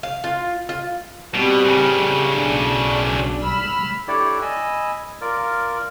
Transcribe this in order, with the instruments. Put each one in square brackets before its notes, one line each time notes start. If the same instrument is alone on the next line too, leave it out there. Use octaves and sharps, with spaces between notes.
[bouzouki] F5
F4
F4
[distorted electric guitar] B2 [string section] G3 C4
[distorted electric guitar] A2 C#3
[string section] B1 D4
B5 E6 F6
[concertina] D4 E4 G4 A4 C#5 D5
D#5 G#5 B5 E6
F4 A#4 D5